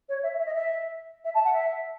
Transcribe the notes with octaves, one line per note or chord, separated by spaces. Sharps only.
C#5
E5
E5
D#5
E5
E5
A5
F#5
E5